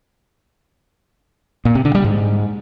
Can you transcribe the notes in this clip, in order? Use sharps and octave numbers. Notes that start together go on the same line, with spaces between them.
A#2
C3
D3
G3
G#2